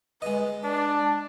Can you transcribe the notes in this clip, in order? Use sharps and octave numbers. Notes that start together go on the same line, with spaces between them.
G#3 B4 D#5
D4 A5